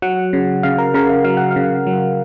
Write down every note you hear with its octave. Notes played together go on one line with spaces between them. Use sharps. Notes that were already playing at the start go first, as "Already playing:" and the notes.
F#3 F#5
C#3
C#3 F5
A#4
C#3 A#4
F5
F#3 F5
F#5
F5
C#3
F#3